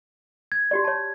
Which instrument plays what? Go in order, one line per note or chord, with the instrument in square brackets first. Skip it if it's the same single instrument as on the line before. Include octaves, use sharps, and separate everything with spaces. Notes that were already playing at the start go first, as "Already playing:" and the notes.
[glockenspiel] G#6
[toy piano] F#4 G4 D5
C#5 A5